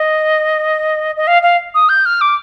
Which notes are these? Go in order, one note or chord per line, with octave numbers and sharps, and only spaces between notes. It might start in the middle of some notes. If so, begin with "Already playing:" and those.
Already playing: D#5
D#5
F5
F5
D#6
G6
F6
D6